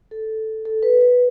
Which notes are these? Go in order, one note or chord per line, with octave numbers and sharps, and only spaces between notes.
A4
A4
B4
B4